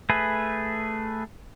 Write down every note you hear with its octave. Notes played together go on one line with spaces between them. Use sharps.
A3 G#4 B4